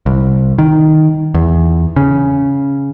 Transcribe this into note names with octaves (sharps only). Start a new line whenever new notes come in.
C2
D#3
E2
C#3